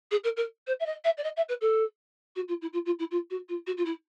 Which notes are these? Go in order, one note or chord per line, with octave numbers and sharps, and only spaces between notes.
G#4
A#4
A#4
C5
E5
D#5
E5
D5
D#5
E5
B4
A4
F#4
F4
E4
F4
F4
E4
F4
F#4
F4
F#4
F4
E4